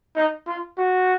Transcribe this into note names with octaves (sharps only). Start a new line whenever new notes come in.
D#4
F4
F#4